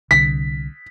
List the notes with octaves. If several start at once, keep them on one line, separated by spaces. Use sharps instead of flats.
C2 D3 B6